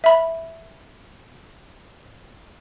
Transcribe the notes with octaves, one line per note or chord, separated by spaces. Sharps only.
E5 B5